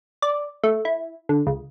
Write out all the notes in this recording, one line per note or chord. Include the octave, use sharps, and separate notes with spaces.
D5
A3
E4
D3
C#2